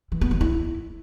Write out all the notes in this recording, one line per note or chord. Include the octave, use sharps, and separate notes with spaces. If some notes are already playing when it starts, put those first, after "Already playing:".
E3
B3
G#3
E4